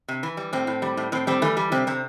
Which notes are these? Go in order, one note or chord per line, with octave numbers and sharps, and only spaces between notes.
C3
E3
G3
A2 C4
A2
G3
A2
A2 C4
G3 C4
E3 A3
G3
C3 C4
C3 C4